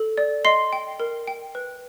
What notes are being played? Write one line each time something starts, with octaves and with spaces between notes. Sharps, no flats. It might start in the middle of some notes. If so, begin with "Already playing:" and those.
Already playing: A4
D5
D#5 C6 C7
G5
A#4
G5
B4